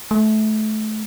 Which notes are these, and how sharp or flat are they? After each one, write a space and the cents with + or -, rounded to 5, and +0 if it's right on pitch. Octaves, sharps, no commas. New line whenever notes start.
A3 -25